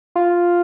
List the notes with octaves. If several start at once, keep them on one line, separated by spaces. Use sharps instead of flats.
F4